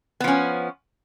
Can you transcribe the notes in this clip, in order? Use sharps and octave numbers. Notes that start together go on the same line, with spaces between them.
F3 B3 C#4